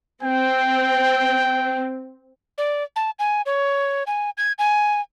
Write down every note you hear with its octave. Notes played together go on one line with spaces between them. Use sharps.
C4 G5
D5
A5
G#5
C#5
G#5
G#6
G#5